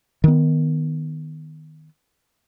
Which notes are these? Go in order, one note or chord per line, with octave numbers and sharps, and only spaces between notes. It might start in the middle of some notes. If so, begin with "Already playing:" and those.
D#3 B3